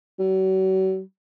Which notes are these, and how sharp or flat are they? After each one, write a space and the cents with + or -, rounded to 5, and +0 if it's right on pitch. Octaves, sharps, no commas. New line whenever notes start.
F#3 +40